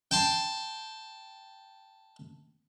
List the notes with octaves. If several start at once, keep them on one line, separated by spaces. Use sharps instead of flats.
G5 A5 C6